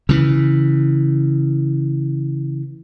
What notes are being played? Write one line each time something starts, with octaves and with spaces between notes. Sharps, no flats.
C#3 E3